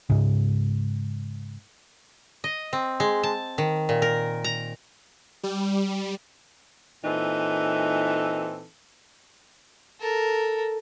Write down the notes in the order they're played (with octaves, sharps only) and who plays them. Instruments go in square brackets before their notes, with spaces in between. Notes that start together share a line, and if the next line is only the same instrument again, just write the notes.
[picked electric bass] G#2 C#3
[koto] D#5
C4
G#3
A5
D#3
A#2
A#4
A#5
[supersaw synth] G3
[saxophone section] A#2 E3 C4 D#4 A4
[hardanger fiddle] A4 A#4